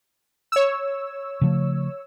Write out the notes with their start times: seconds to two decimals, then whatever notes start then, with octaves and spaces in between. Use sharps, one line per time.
0.52 C#5 E6
1.41 C#3 F3 A3